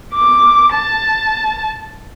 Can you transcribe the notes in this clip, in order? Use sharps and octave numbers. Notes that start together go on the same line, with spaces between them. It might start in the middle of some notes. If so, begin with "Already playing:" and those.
D6
A5